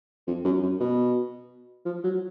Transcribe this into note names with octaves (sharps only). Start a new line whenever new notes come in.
F2
F#2
F#2
B2
F3
F#3